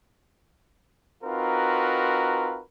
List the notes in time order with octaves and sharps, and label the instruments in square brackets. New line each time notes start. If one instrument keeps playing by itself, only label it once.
[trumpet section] C4 D#4 F4 F#4 A#4 B4